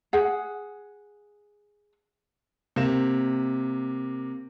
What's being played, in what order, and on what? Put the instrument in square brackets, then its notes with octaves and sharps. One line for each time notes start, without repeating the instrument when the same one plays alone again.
[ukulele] G#4 F#5
[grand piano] C3 A#3 E7